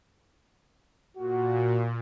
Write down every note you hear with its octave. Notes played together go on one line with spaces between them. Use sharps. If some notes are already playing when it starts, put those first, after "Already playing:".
A#2 F#4